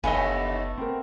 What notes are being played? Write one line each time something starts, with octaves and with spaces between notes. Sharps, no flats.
F#1 D#2 D3 A3 B3 D#5 F5 G#5
C4 A#4